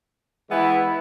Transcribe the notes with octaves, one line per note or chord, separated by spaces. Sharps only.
E3 G#3 B3 E4